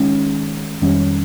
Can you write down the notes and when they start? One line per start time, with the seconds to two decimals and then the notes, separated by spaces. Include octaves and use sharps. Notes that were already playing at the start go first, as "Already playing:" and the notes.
Already playing: D#3 G#3 C#4
0.82 F2 D#3 G3 C#4